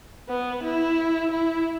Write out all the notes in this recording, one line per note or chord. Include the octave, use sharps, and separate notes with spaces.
B3
E4
E4